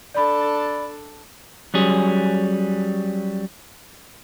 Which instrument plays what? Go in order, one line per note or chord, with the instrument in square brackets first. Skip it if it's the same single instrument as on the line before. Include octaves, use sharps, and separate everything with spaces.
[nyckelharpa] D4 A4 [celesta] D5 B5
[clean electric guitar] F#3 G3 C#4 G#4